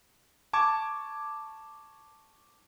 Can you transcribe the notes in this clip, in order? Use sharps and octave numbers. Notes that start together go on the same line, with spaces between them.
A5 C#6 D6 G#6